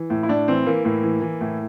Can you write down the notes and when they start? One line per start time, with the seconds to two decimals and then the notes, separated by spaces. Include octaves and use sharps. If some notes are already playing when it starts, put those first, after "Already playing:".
Already playing: E3
0.10 A2
0.23 E4
0.29 A2 D4
0.48 E3 C4
0.66 E3 A#3
0.85 A2 A#3
1.03 E3
1.22 E3
1.41 A2